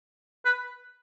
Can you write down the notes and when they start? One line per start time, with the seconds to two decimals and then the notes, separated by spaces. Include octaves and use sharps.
0.45 B4